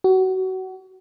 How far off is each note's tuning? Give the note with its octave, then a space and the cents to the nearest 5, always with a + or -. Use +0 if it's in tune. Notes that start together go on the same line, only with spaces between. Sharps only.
F#4 +25